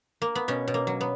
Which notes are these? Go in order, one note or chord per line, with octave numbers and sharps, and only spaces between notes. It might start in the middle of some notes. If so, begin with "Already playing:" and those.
A#3
B3
B2 C#4
B2
A#3
F#3
B3